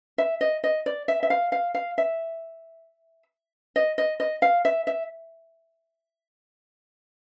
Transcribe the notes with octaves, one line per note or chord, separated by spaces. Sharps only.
E5
D#5
D#5
D5
E5
E5
F5
F5
F5
E5
D#5
D#5
D#5
F5
E5
E5